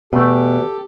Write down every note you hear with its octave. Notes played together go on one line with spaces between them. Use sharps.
E2 B2 A3 G4 A4